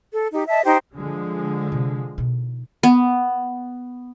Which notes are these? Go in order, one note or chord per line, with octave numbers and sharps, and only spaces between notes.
A4
D#4 G4
D#5 E5 A5
D#4 G4 C5 G5
D3 F3 G#3
C3
B2 D#4
B3